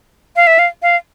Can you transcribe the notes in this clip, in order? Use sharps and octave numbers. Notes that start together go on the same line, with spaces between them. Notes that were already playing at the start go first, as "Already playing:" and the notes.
F5
E5
F5
F5